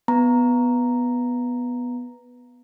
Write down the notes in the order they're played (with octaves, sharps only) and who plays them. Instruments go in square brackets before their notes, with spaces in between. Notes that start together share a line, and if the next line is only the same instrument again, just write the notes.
[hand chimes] B3 A#5